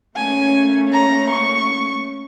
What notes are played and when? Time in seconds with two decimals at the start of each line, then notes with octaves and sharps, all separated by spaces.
0.16 A3 A#3 C#4 G#5
0.92 A#5
1.30 C#6